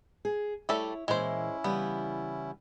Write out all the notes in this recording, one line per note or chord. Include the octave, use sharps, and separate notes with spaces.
G#4
G3 A3 E4 A4 C#5
A#2 E3 G#3 C#4 E4 C5
C#3 E3 G3 B3